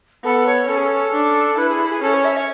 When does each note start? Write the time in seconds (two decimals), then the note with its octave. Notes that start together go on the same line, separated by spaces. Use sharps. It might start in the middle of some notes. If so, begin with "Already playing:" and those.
0.24 B3 A4
0.46 C#5
0.69 C#4 A4
0.77 G#4
0.85 A4
1.13 D4
1.58 E4 B4
1.69 G#4
1.91 G#4
2.02 C#4 A4
2.14 C#5
2.24 E5
2.36 C#5